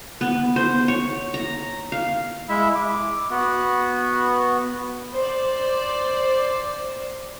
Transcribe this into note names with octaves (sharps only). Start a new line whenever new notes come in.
B3
C5
C#5
A#5
F5
G#3 E4 E5
D6
B3 F#4
C5 D5